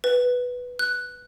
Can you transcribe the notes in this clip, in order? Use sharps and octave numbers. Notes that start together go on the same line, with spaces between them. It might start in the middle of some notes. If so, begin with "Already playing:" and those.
B4
F#6